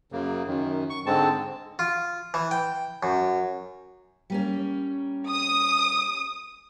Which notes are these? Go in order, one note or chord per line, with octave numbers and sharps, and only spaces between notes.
F#2 C#3 A#3
F#2 D#3
C#6
G#2 D3 G#3 C4 A5
F4
E3
G5
F#2
G3 A#3 C#4
D#6